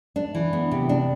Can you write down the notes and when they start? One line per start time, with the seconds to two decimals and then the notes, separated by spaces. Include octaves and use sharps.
0.16 D4
0.35 E3
0.53 B3
0.71 C3
0.89 D4